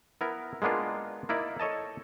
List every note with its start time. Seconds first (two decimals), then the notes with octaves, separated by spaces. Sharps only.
0.21 B3 E4 A#4
0.62 G#3 A#3 B3 D4 F4
1.29 A#3 D#4 E4 D5
1.60 A4 C#5 D#5 A5